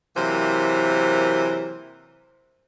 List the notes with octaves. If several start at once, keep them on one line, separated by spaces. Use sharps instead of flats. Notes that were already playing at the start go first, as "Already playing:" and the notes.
C3 E3 F#3 A#3 A#4 C5